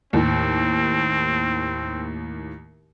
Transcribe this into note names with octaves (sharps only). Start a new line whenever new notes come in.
D#2 A2 C4